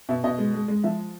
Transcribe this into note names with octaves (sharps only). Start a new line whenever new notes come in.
B2 E5
B2 D#5
G#3
G#3
G#3
F3 E5